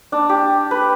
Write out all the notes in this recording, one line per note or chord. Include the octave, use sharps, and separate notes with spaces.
D4
G4
B4